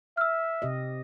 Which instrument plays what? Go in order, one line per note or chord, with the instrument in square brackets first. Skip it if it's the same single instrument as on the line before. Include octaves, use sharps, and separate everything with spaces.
[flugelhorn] E5 [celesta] E6 F6
[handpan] C3 G4 D#5